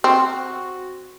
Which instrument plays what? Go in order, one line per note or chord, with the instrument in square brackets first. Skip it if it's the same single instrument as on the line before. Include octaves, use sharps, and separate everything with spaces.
[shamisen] C4 [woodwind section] F#4